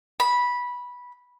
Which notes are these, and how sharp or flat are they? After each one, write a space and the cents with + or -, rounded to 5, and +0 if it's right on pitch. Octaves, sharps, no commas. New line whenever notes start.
B5 -10